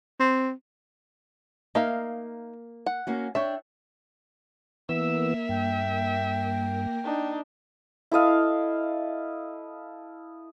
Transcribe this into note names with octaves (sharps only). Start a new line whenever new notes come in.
C4
A#3 D#4 E5 F5
F#5
A#3 C#4 F#4
D4 C#5 E5 G5
E3 A#3 B3 A#4 E5 E6
G2 G5
D4 D#4
E4 A4 D#5 F5